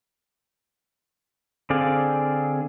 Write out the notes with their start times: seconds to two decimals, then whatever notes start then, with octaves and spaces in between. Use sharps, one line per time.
1.70 D3 C4 G#4 D5 F5